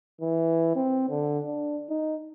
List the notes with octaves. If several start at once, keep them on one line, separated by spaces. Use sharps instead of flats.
E3
C4
D3
D4
D#4